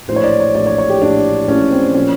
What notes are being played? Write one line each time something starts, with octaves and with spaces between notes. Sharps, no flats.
A#1 A2 E3 C5
C#5
D5
C#5
A#1 A2 E3 D5
C#5
C#5
G4
A#1 A2 E3 D4
A#1 A2 E3 C#4
C4
A#2 F3 C#4